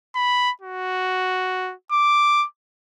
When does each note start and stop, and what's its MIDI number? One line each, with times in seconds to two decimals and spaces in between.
0.15 0.51 83
0.62 1.74 66
1.92 2.46 86